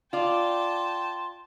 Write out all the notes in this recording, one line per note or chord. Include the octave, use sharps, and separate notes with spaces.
F4 D5 G5 A5 C6